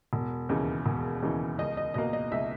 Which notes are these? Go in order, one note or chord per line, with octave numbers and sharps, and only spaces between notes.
E1
D#2 C#3 E3
E1
D#2 C#3 E3
C#2 D#5
D#5
B2 A#3 D#5
D#5
C#2 E5